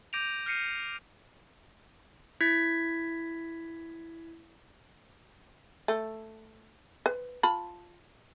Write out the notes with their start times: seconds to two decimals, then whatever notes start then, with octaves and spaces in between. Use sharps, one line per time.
0.13 D6 G6 A#6 D7 D#7 F7
0.46 F6 G6 A#6 C7 C#7 D#7
2.41 E4 G#6 B6
5.88 A3
7.06 B4
7.43 F4 A5 B5